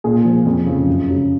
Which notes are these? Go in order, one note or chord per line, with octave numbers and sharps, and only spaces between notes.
A#2 G#4
F3
F2
C#3 F3
F#2
C#3 F#3